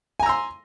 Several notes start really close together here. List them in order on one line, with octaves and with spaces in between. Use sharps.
G#5 A#5 E6 C6